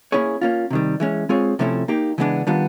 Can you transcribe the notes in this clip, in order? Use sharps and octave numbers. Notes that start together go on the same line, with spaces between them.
A#3 C#4 E4 G#4 C#5
A#3 C#4 F4
C3 D#3 G3
E3 G#3 C#4
G#3 C4 F4 G#4 C#5
C3 F3 A3 C#4 E4
A#3 D#4 G4
C#3 E3 G#3 B3 D4
D#3 G3 B3 D4 F4